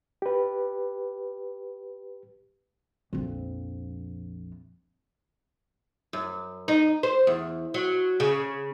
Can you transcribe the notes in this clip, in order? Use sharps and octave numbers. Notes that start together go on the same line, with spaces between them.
G4 B4
A#1 F2
F#2
D#4
C5
E2
F#3
C#3